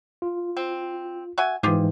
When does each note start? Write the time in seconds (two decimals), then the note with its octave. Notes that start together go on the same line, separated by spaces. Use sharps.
0.22 F4
0.57 C4
1.38 F#4 E5 G#5
1.63 G#2 E3 F4 G4 G#4